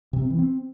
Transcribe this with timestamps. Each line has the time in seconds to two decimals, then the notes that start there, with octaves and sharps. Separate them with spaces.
0.13 C3
0.22 C4
0.30 E3
0.39 C4